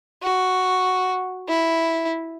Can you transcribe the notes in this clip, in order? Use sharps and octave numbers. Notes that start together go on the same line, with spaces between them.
F#4
E4